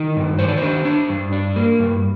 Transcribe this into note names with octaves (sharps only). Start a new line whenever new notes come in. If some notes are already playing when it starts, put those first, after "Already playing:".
Already playing: D#3
G2
D#3 C5
D5
C5
D4
D4
G2
D4
A#3
G2